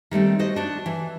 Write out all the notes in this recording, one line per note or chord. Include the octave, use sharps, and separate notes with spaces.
D#3 G3 A3 C4
F#4 C5 D#5
D4 F#4
E3